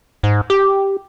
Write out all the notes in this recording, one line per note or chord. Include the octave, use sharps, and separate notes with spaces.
G#2
G4